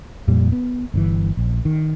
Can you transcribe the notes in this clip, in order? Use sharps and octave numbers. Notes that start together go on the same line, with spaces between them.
F2 A#2 G3
B3
G1 D3 E3
A#1
D#3